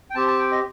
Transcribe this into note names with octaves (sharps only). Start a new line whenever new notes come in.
G5
C4 G4 A5
A5
G5
D#5